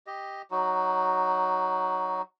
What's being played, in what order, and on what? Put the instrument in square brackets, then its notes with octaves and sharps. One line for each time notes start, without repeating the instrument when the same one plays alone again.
[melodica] G4 D#5
F#3 D#4 F#4